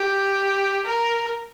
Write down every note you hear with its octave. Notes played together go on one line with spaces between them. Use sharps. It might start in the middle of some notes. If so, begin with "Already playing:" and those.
Already playing: G4
A#4